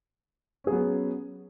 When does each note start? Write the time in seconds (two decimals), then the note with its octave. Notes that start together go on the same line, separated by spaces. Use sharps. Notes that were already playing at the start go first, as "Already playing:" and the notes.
0.64 C#4
0.67 G#4
0.70 F#3
0.73 B3